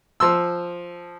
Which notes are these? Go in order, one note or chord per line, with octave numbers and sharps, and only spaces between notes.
F3 C6 E6